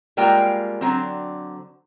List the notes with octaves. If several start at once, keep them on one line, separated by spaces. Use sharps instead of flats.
G3 G#3 A#3 F4 G5
D3 F#3 C4